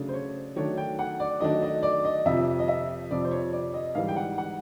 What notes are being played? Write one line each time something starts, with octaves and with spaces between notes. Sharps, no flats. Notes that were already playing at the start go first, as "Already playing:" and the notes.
Already playing: C#3 F#3 A3 D4
C5
C#5
D#3 F#3 A3 D4 C#5
G5
F#5
D5
D#3 F#3 A3 D4 D#5
D#5
D5
D#5
F2 C3 F3 E5
D#5
E5
F2 C3 F3 D5
C5
C#5
D5
D#5
G#2 E3 G3 F5
G5
F#5
F#5